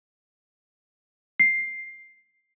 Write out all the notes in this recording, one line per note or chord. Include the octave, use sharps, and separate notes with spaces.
C7